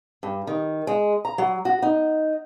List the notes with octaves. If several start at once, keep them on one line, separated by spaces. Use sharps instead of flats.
G2
D#3
G#3
A#5
F#3
F#4
D#4